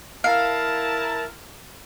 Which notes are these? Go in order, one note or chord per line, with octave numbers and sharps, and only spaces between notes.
E4 A#4 F5 A5